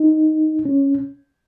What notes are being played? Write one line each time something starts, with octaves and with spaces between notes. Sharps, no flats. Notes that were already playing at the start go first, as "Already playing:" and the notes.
Already playing: D#4
C#4